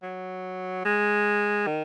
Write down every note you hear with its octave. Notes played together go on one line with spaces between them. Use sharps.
F#3
G#3
D#3